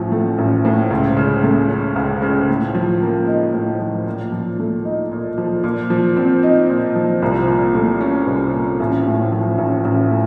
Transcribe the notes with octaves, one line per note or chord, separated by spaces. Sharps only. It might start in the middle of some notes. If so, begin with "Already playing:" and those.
Already playing: A1 A2 F3
A3
A1
A2
C#2
C#3
A3
C#4
C#2
C#3
A2
F3
A#3
D#4
A2
F3
A#2
F3
A3
D#4
A#2
F3
A#2
F3
C4
D#4
A#2
F3
C2
A#2
A3
C#4
C2
A#2
A1
A2
F3
A1
A1
A2